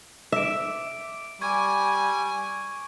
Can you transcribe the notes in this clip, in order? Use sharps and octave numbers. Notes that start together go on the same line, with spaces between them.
E5 D6 D7
G3 G#5 C#6 G#6